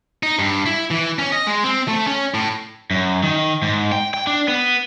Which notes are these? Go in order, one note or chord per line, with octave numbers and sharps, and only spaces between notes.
D#4
G2
E4
E3
C#4
D#5
G#3
C4
A3
C#4
A2
F#2
D#3
G#2
G5
G5
D4
B3